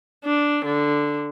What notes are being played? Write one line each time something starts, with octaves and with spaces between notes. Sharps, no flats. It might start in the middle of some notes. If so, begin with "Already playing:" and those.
D4
D3